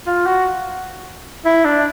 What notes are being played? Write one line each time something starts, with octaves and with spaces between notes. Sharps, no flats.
F4
F#4
E4
D4